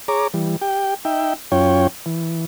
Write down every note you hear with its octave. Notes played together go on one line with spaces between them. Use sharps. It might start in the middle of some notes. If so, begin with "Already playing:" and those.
G#4 C#5 A#5 D6
E3 G3
G4 G5
D#4 E5 G5
F#2 C#4 F4 C#5 G5
E3